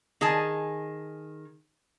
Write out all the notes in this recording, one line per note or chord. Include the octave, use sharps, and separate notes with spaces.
D#3 G#4 G#5 A5